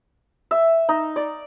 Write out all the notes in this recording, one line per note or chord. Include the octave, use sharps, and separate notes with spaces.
E5
D#4
D5